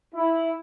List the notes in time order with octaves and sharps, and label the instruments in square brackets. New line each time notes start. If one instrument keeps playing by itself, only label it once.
[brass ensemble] E4